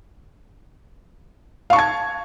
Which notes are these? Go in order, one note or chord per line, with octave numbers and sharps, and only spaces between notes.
F5 A5 C#6 G#6